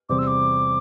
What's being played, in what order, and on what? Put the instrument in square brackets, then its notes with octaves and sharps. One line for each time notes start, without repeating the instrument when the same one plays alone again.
[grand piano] E2 C3 G3 C4 [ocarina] D6
[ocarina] E6
D6